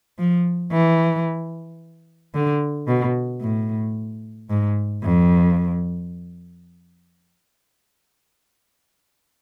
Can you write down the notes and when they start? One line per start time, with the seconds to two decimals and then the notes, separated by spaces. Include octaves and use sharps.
0.18 F3
0.72 E3
2.34 D3
2.87 B2
3.41 A2
4.49 G#2
5.03 F2